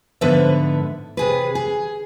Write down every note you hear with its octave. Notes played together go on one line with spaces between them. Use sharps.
G#2 D3 F3 B3 B4 E5
C3 G#4 B4
G#4